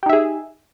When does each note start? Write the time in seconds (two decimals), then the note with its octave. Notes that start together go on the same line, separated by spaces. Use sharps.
0.03 G4
0.06 D#4
0.10 E5
0.13 G#4